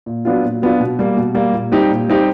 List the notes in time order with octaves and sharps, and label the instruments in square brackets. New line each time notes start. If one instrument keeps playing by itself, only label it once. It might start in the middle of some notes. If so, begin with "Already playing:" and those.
[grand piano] A#2
F#3 B3 D4 F4
A#2
F#3 B3 D4 F4
B2
G3 A#3
B2
G3 A#3
A#2
G3 C4 D#4 G4
A#2
G3 C4 D#4 G4